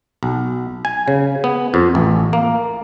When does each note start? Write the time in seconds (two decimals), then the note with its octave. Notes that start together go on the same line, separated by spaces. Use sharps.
0.23 B1
0.85 G#5
1.08 C#3
1.44 B3
1.74 F2
1.95 A1
2.33 A#3